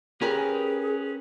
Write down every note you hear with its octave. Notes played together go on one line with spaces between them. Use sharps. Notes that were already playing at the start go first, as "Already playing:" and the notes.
C#4 G4 G#4 A#4 B4 G#5